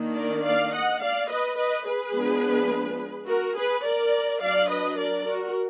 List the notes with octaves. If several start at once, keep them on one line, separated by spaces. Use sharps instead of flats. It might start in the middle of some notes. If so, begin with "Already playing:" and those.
Already playing: D#3 A#3 D4
A#4 D5
D5 F5
D#5 F#5
D5 F5
B4 D#5
B4 D#5
G#4 B4
F3 G#3 B3 D4
F#4 A#4
G#4 B4
A#4 D5
F#3 D4 D5 F5
B4 D#5
A#4 D5
F#4 A#4